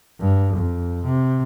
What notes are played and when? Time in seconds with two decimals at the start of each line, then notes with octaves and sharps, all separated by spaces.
0.20 G2
0.56 F2
1.05 C3